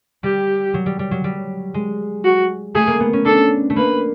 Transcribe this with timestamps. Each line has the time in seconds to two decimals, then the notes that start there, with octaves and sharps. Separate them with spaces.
0.23 G3 G4
0.74 F#3
0.86 G3
0.99 G3
1.11 F#3
1.24 G3
1.74 G#3
2.24 F#4
2.75 A3 G#4
2.87 A#3
3.00 B3
3.13 C#4
3.25 D4 A4
3.70 A3
3.76 A#3 B4